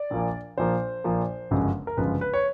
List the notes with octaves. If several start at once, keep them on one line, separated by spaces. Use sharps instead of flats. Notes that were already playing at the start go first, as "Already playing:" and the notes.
Already playing: D5
A#1 A#2 F3 A#3
A#1 A#2 F3 A#3 C5
A#1 A#2 F3 A#3
G1 F#2 C#3 F3 G#3
A#4
G1 F#2 C#3 F3 G#3 B4
B4
C#5